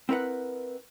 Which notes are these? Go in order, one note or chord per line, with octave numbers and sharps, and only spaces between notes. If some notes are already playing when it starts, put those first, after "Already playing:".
C4 E4 A#4 B4 F#5